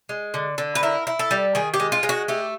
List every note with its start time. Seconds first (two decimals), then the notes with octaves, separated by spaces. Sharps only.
0.09 G#3
0.34 D3
0.58 D3
0.75 B4
0.83 E4 A#4
1.07 E4
1.19 A4
1.31 G3
1.55 D#3 G#4
1.74 G4
1.80 G#3
1.92 F4
2.03 G#3
2.09 F#4
2.28 A3 G4